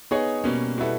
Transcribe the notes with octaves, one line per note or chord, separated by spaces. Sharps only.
B3 D#4 G#4 C#5
B2 G3 A#3 C#4
B2 G3 B3 E4 A4